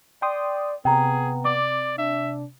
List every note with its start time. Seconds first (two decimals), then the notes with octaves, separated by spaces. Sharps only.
0.22 D5 G5 C6 D#6
0.85 C3 B3 G#4 G5 A#5
1.45 D5 D6
1.98 D4 E5